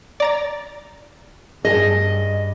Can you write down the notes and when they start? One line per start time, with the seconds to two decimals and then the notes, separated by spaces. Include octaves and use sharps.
0.20 D5 A#5 A6
1.65 G2 G#4 D#5 A5